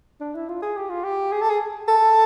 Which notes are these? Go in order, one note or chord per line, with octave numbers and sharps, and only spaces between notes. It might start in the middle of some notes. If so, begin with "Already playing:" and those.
D4
E4
F4
G#4
G4
F4
G4
G#4
A4
G#4
A4